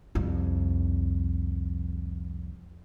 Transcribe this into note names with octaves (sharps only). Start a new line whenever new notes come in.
C2 F2